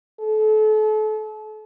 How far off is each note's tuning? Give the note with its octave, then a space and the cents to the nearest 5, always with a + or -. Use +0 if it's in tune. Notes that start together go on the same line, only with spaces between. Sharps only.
A4 -35